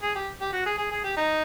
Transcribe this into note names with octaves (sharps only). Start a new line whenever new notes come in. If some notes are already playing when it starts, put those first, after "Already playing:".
G#4
G4
G4
F#4
G#4
G#4
G#4
G4
D#4